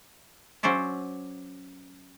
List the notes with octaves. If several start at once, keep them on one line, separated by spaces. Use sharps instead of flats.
F#3 C#4 C5 D5 E5